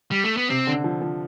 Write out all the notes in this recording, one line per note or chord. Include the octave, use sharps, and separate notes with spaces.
G3
A3
B3
C3 C4
D3
F3
F3